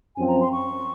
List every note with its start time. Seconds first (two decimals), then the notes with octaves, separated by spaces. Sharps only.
0.16 F#2 F3 C4 G#5
0.28 A#5
0.40 C6
0.52 C#6